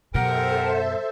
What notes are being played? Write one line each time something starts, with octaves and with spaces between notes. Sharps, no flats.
F#2 B2 G4 A4 A#4 C5 E5 F#5